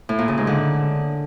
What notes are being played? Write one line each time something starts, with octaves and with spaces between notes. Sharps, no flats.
A2
A#2
C#3
G#2
D3